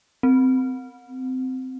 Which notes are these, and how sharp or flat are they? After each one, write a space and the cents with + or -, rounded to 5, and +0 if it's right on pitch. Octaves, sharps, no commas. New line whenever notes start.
C4 -20